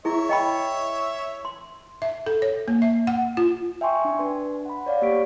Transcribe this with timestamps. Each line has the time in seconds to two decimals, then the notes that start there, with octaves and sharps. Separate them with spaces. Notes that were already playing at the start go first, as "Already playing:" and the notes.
0.05 E4 G#4 C#5 E5
0.29 D#5 G5 B5
1.45 C6
2.02 E5
2.26 A4
2.42 C#5
2.68 A#3
2.82 E5
3.07 F#5
3.37 F4
3.81 E5 G5 G#5 C6 C#6
4.05 D4
4.18 D4 B4 C6
4.66 F#5 B5
4.86 C#5 D5 F5
5.02 A#3 G4 C#5 C#6 B6 D7